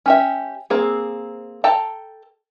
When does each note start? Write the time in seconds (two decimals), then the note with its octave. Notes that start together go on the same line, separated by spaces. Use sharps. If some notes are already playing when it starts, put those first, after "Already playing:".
0.06 C#4 G4 E5
0.70 A#3 C4 G#4
1.64 A4 G5 A5 A#5